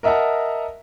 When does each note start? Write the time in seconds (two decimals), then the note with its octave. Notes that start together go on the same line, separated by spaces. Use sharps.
0.03 A#4 D#5 E5 F#5 A5 A#5